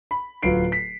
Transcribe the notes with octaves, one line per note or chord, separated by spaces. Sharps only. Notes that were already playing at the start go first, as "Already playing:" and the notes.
B5
D1 F#3 F4 B4 C7 D7
B6